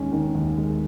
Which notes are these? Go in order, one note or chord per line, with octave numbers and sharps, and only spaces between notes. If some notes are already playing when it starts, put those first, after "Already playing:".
Already playing: D#2 G#3 C#4
D#3
D#2
G#3